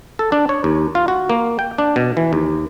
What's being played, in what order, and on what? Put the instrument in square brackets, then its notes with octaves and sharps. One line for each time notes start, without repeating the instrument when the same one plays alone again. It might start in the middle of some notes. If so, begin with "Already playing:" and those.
[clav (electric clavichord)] A4
D4
C#5
D#2
F4
F#4
A#3
G5
D4
B2
E3
D#2